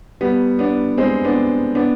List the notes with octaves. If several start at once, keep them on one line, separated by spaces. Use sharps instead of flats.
G3 B3
B3 D4
G#3 C4
B3 D4
B3 D4